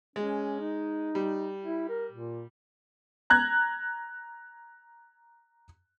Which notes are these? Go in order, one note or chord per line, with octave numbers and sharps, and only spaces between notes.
G#3 C#4
D#4
G3
E4
A#4
A#2
A#5 F#6 G#6